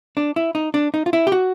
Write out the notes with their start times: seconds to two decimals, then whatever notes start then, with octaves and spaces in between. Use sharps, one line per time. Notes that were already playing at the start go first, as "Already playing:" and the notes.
0.17 D4
0.36 E4
0.55 D#4
0.74 D4
0.94 D#4
1.06 F4
1.13 E4
1.27 G4
1.32 F#4